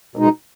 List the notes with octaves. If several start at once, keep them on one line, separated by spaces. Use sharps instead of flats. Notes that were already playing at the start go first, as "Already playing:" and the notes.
B2 G#3 D#4